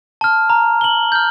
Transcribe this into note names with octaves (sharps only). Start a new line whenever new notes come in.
A5 F6
A#5
F#7 G7
F6 G6